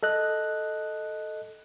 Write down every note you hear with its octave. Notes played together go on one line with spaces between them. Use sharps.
A4 D#5 F#6